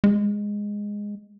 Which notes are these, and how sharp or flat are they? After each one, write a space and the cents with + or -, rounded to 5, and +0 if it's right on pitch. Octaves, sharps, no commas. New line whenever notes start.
G#3 -10